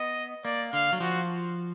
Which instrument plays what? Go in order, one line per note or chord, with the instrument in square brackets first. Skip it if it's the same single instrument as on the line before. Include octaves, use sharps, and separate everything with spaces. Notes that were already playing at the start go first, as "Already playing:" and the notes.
Already playing: [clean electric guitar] B3 [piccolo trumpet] D#5
[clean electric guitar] A#3 [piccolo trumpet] D5
[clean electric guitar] D3 [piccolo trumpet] F5
[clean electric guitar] F#3
[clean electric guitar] F3 [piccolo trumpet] F#4